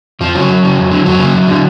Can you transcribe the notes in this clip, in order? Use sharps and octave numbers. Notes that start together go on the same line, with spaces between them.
F2 F3
C#3 F#3
F#2
C#3
F2
D3
F2 F#3
C#3
F#2
D3